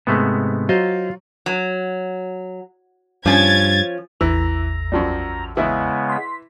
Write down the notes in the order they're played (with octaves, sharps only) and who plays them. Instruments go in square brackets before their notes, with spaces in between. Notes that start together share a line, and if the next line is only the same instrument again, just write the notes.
[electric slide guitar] G#2 C3 [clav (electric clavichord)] G#3 A3 B3
[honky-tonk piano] F#3 [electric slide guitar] F4 [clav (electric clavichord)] C5 D#5
[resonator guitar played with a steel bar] F#3
[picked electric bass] G2 [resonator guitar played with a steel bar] F3 C#4 [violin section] G#6 A6
[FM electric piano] A1 E2 E6 [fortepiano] E3 [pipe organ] A#5
[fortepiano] F#2 F3 G3
[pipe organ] C#3 G#3 B3 [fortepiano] E3 E4
[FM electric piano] C6 B6